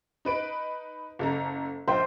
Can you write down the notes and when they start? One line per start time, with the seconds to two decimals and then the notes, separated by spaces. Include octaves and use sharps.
0.25 D#4 B4 D7
1.19 F#1 A4 A#5
1.88 A#1 C5 G5